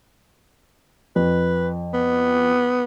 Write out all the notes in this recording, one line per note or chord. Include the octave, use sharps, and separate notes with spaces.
F2 B4
B3